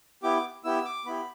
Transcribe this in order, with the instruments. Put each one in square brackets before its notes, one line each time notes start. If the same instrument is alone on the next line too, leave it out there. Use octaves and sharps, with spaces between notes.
[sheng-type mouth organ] B3 E4 G4 D6
B3 E4 G4 E6
D6
B3 E4 G4 B5